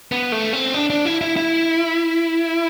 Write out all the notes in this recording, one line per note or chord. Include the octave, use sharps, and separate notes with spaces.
B3
A3
C4
D4
D4
E4
E4
E4